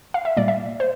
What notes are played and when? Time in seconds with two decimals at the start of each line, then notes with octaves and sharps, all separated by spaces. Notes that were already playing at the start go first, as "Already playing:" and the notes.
0.14 F5
0.25 E5
0.37 A#2 G3 A#3 D5
0.48 E5
0.80 C5